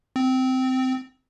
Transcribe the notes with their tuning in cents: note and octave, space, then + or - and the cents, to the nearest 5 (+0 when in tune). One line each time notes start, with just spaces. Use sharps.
C4 -15